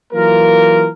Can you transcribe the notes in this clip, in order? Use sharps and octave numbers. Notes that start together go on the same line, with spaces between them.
E3 F#3 A#3 F4 A#4